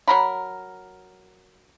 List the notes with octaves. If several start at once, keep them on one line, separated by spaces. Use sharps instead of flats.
F#3 A#4 B5